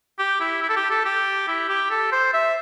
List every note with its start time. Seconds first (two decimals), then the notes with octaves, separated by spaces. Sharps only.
0.19 G4
0.40 E4
0.62 E4
0.69 A4
0.76 G4
0.90 A4
1.05 G4
1.48 E4
1.69 G4
1.91 A4
2.12 C5
2.33 E5